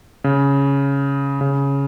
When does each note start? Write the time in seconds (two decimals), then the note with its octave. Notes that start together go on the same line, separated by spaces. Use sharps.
0.24 C#3
1.41 C#3